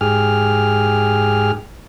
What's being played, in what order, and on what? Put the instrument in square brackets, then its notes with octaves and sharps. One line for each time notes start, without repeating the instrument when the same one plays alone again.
[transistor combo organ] G#2 G4 G#4 F6